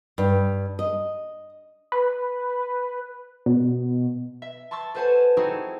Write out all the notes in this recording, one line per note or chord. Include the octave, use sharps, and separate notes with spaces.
G2
D#5
B4
B2
E5
A5 C6 C#6 E6 A6
A4 B4 C5 F#5 G#5 A5
C4 D#4 E4 F#4 G#4 A4